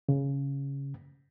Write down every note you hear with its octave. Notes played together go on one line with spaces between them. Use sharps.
C#3